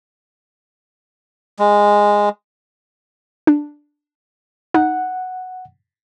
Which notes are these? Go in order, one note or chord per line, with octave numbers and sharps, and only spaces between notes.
G#3
D4
D#4 F#5